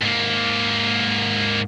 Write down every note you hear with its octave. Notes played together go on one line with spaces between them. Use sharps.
G#2 A#3